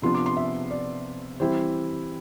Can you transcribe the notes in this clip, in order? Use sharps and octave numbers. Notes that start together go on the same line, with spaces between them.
C3 F3 B3 D4 F4 C6
D6
C6
E5
D5
E3 G3 C4 E4 C5